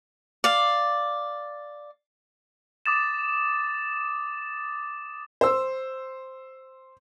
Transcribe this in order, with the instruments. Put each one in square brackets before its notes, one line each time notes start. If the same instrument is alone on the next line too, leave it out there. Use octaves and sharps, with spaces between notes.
[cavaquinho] D5 F5
[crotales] D6 D#6 A6 E7
[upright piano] C5 E6